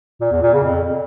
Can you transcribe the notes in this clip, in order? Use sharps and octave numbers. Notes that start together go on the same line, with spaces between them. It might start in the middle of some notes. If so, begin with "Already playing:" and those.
A#2
E2
A#2
C#3
F2